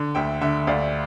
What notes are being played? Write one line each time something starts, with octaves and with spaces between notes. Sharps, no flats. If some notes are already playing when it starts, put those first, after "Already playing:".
Already playing: D3
D2 E5 G5
D3 E5
D2 D5 F5